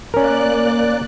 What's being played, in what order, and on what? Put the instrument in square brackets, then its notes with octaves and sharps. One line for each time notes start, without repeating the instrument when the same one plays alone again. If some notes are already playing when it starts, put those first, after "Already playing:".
[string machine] A#3 D5 F#6 [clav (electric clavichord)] C#4 A#4